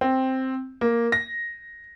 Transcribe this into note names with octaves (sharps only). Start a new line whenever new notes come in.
C4
A#3
A#6